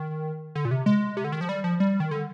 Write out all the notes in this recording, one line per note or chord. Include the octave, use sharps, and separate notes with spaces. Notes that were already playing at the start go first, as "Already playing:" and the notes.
Already playing: D#3
D3
A#2
C3
G#3
C3
D3
D#3
F3
G3
F3
G3
D#3
D3